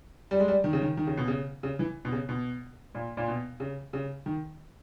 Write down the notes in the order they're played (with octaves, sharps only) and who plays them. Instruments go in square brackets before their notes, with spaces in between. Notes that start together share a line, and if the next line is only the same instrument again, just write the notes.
[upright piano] G3
G#3
G3
D#3
C#3
D#3
D#3
C#3
B2
C#3
C#3
E3
B2
C#3
B2
A#2
A#2
B2
C#3
C#3
D#3